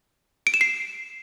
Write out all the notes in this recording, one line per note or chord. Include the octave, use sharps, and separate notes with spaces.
D7
E7
C7